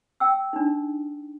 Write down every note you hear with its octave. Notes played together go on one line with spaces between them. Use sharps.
G5 E6
D4 D#4